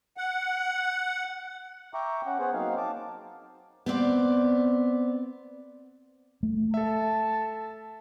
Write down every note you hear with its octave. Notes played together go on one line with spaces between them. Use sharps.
F#5
E5 G5 A#5 C#6 D6
C#4 F#5
B3 G#4 C5 F#5
F#3 A#3 C4 D#4 F5
A5 D6
B3 C4 D5
A3
A4 E5 A5